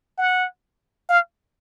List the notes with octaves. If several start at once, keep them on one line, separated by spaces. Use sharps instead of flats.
F#5
F5